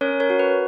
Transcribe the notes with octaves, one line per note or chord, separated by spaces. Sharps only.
C#4 A#4 C#5
A#4 C#5
F#4
B4